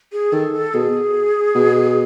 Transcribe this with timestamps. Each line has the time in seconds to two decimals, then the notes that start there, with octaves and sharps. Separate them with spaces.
0.13 G#4
0.33 D#3 A4
0.53 A4
0.74 B2 G#4
1.55 B2